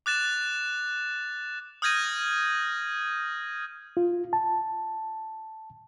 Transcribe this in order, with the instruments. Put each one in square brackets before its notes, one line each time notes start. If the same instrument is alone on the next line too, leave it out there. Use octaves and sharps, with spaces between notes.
[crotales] D6 F#6 A6 E7
D#6 F6 G6 G#6 A#6 D#7
[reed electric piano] F4
A5